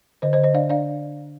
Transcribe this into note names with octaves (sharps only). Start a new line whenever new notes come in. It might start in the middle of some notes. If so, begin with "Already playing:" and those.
D3 C5 D#5
C5 D#5
D3
C5 D#5
D4 D5 F5
D4 D5 F5